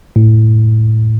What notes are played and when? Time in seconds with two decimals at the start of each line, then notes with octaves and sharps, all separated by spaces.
0.16 A2